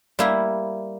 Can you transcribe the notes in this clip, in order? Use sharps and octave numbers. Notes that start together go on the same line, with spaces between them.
G3 A#3 E4